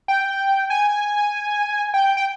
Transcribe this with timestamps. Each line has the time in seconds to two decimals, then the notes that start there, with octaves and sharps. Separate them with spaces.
0.08 G5
0.70 G#5
1.94 G5
2.17 G5